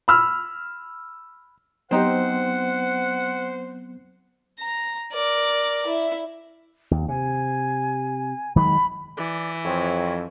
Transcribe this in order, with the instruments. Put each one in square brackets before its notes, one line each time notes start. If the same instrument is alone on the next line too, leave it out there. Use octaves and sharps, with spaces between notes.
[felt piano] B5 E6 F6
[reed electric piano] F#3 B3 [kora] C4 D#4 G4 [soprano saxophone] C5 [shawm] F#5
[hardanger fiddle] A#5
A#4 D5
E4
[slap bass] D#2
[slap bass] C3 [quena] G#5
[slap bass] D#3 F#3 G#3 [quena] B5
[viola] E3 [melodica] D5
[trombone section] F2 [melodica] C4 C#5